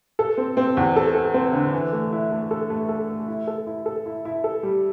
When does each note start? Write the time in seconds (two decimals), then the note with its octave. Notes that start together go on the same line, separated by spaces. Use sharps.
0.19 A4
0.37 C4
0.57 C4
0.77 E2
0.96 A4
1.15 A4
1.34 C4
1.53 D3
1.73 E3
1.93 A3
2.12 E4
2.32 A3
2.51 A4
2.70 A3
2.89 A4
3.09 A3
3.28 E4
3.47 A4
3.67 E4
3.86 A4
4.06 E4
4.25 E4
4.44 A4
4.63 G3